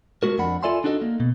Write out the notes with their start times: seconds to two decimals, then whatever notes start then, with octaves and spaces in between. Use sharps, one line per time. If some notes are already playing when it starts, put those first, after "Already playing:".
0.23 G#3 A3 F#4 A#4
0.38 F2 D4 F#5 B5
0.63 F4 A4 D5 E5 G#5 C6
0.84 D4 D#4 F#4 A4 D#5
1.02 A#3
1.20 B2